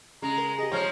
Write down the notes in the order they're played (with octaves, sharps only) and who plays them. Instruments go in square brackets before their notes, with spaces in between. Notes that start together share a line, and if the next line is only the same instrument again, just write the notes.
[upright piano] C#3 [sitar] G#3 [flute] A#5
[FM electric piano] A#4
[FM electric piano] G4 G#4 [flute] D#5
[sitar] F3 G#3 [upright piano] C#5 A#5 F6